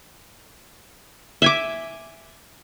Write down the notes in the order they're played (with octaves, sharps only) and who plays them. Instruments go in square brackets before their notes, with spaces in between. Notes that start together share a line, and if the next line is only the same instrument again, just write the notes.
[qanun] E5 G#5 D6